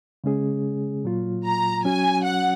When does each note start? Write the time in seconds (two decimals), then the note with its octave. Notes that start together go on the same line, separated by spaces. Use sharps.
0.24 C#3 G#3 C#4 G#4
1.05 A#2 F#3 A#3 F4
1.45 A#5
1.85 F#3 C#4 F#4 G#5
2.25 F#5